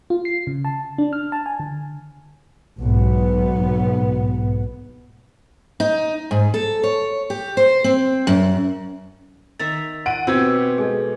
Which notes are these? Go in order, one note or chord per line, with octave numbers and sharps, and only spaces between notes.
F4
C7
C#3
A5
D4
F6
A5
G#5
D3
B1 G#2 B3
D#4
G#2
A4
C#5
G4
C5
C4
F#2
D#3 E5 A#5 A6
F#5 D7 D#7
B2 C4 G4 G#5 E6 G#6
G#3 G#4 A4